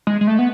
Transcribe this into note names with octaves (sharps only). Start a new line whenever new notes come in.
G#3
G#3
A3
B3